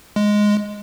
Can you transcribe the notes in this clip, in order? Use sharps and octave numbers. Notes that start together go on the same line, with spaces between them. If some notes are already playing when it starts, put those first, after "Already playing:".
G#3